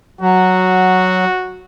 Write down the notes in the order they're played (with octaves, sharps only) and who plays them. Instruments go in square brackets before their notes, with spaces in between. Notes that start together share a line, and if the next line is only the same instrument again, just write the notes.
[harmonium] F#3 [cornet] F#4